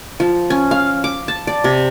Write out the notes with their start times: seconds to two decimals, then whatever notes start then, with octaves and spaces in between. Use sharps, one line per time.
0.20 F3
0.50 C#4
0.71 F5
1.04 D6
1.28 A5
1.47 D5
1.64 C3